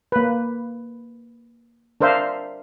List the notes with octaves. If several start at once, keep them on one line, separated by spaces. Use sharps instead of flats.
A#3 B4
D4 A#4 C5 E5 F5